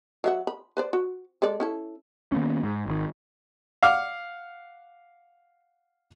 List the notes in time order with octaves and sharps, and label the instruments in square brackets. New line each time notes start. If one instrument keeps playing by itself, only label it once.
[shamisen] F#3 E5 F#5
B5
B4 C5 D5
F#4
G#3 A4 D5
C#4 E4 A4
[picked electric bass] D#3 A#3 B3 C#4
G#2
G#1 D#3
[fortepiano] F5 F#5 D6 F6